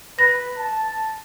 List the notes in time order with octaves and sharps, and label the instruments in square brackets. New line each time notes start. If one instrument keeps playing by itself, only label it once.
[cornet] B4 [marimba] A#6
[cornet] A5